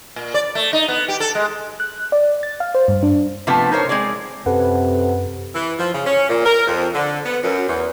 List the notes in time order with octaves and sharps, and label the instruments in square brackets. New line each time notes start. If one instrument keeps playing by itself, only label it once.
[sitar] A#2
D5
A3
D#4
B3
G4
A4
G#3
[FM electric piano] F#6
D5
A6
F5
C5
G2
D4
[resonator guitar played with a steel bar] C3 F3 A3 B3
D#4 A#4 C5 C#5
G#3 C4 G#4 D5
[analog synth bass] F#2 [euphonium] C3 [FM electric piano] A4 B4 F#5
[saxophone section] E3
F3
C#3
C#4
A#2
A#4
F2
D3
B3
F#2
E2